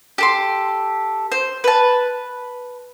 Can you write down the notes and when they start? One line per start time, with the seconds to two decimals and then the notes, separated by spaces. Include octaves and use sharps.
0.18 G4 A4 C6
1.32 C5
1.64 B4 A5